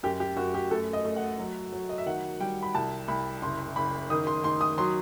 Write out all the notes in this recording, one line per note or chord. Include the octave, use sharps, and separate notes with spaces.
F#2 G4
G4
F#2 F#4
G4
A3 A4
D#5
A3
F#5
F#3
F#3
D#5
E5
D#3 F#5
G3 G5
B5
C2 A5
C2 B5
F#1 C6
F#1 B5
D#3 D#6
C6
D#3 C6
D#6
F#3 C6